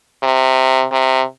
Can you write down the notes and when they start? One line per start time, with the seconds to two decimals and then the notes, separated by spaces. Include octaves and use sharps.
0.23 C3
0.92 C3